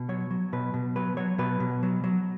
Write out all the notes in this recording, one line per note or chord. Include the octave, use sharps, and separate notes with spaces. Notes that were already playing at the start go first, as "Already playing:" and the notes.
Already playing: B2
F#3 C#5
F#3
B2 B4
B2
F#3 B4
F#3 C#5
B2 B4
B2
F#3
F#3